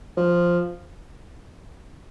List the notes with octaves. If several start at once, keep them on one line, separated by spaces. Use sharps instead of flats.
F3